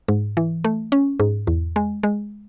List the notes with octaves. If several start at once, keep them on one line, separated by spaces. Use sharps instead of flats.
G#2
E3
A3
C#4
G#2
E2
G#3
G#3